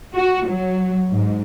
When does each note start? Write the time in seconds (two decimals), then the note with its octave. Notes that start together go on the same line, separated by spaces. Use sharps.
0.14 F#4
0.47 F#3
1.11 G#2